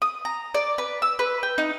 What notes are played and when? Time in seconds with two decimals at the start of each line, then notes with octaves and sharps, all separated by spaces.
0.02 D#6
0.25 A#5
0.55 D5
0.78 B4
1.02 E6
1.19 B4
1.43 G5
1.58 D#4